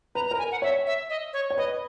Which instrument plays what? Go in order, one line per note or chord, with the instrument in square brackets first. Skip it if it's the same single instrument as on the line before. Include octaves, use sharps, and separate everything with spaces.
[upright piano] B4 [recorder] A#5
[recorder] A#5
[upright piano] A#4
[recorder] G#5
F#5
[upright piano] C#5 [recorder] E5
[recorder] E5
D#5
C#5
[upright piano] C#5
[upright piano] B4 [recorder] D#5